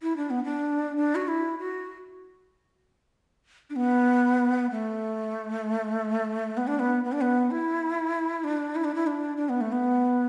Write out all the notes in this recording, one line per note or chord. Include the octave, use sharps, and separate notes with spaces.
E4
D4
B3
D4
D4
F#4
E4
F#4
D4
B3
A3
B3
D4
B3
B3
D4
B3
E4
D4
E4
D4
E4
D4
D4
B3
A3
B3